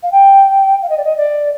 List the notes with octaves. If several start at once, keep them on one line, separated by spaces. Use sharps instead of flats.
F5
G5
F5
D#5
D5
D#5
D5